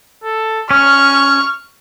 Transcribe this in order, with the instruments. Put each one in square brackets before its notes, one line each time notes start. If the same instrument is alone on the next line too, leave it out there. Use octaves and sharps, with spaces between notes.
[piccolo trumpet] A4
[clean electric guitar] C#4 [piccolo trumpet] C#6 [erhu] F6